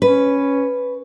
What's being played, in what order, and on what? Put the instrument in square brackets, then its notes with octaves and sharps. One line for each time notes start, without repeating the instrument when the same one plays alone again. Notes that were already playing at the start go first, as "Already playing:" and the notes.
[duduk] C#4 [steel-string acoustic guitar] B4